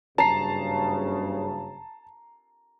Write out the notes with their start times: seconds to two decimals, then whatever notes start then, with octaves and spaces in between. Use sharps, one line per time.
0.18 F#1 G2 C#3 A5 A#5 C7